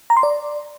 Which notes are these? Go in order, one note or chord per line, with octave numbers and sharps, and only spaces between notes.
A#5
C6
D5